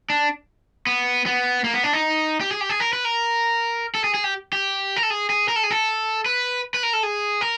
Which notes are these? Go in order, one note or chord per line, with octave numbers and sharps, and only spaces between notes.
D4
B3
B3
A#3
B3
D4
D#4
G4
G#4
G4
G#4
A#4
B4
A#4
A4
G#4
G#4
G4
G4
A#4
A4
G#4
G#4
A#4
A4
G#4
A4
B4
B4
A#4
A4
G#4
A#4